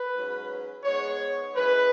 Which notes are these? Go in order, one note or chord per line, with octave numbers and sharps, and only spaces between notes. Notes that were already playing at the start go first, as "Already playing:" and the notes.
Already playing: B4
G#2 F#3 C#4
G#2 G#3 B3 C#5
F#2 E3 G#3 B4